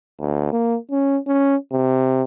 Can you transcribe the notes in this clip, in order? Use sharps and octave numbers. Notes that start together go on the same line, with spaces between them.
D2
A#3
C#4
C#4
C3